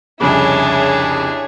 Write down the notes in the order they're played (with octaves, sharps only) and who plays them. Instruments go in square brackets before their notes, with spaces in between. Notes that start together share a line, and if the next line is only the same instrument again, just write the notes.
[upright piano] C2 F2 C#3 [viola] D4 [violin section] E4 G#4 C#5